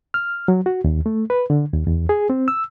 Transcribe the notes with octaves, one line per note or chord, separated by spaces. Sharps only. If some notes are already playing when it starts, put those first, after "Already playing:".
F6
F#3
F#4
D#2
A3
B4
D3
D#2
E2
G#4
C4
E6